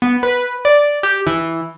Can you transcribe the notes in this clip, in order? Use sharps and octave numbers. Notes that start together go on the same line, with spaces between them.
B3
B4
D5
G4
E3